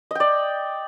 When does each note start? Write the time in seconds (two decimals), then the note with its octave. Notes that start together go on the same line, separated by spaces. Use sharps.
0.11 D#5
0.15 G5
0.20 D5